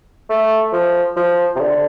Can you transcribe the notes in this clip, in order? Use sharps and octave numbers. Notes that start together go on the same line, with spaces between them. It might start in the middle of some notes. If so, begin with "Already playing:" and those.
A3
F3
F3
C3
D3